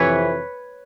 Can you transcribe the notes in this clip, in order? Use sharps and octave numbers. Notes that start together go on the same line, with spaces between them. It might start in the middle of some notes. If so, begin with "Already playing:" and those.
Already playing: F2 C3 E3 B4 C#5